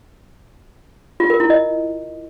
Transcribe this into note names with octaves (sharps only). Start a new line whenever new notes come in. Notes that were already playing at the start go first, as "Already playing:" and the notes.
F4
A#4
E4
D#5